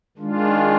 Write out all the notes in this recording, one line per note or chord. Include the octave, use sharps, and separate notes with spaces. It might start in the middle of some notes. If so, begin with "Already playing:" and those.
D#3 G#3 D4 F4